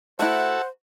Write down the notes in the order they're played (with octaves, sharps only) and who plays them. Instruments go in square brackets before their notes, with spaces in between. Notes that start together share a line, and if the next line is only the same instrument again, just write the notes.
[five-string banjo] A3 E4 [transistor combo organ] F#4 A4 E5 [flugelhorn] C5 [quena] F#5